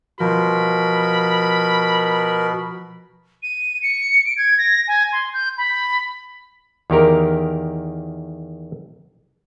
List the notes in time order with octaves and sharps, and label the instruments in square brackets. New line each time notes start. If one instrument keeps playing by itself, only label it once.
[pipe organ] B2 [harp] F3 [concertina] A#4 [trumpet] B5
[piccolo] D#7
C#7
D7
G#6
A#6
G#5
C6
G6
B5
[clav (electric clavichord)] E2 D#3 G4 A#4